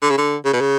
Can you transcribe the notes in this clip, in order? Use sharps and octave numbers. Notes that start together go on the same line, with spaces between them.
D3
C#3
D3
C#3
B2
C#3